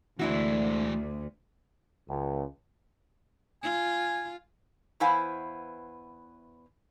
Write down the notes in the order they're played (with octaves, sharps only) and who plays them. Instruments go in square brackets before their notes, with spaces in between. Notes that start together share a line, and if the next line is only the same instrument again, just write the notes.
[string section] D2 [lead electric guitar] E3 G#3 [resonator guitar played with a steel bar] D4 E4 F#4
[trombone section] C#2
[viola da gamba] F4 [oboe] G#5
[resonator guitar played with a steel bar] E2 B3 E4 C5 F5 G#5